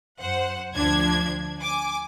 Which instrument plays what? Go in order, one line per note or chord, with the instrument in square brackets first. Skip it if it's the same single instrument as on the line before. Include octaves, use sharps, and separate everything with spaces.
[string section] F#2 C5 F#5
D2 F3 D4 G#6
G#5 D6